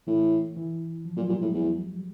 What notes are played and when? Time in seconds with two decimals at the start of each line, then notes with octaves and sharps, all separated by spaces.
0.07 A2 E3
0.56 E3
1.05 F3
1.17 A#2 F#3
1.29 A#2 G3
1.42 A2 G#3
1.54 E2